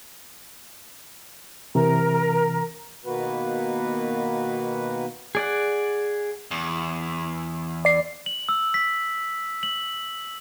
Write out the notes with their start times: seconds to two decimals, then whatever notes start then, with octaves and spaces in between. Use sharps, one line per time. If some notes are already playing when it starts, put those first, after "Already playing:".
1.75 C3 E3 A#4 A#5
3.05 B2 D#3 A#3 F#4 B4
5.35 G#4 D5 F#5
6.51 E2
7.85 D5 C7
8.26 F#7
8.49 E6
8.74 B6
9.63 F#7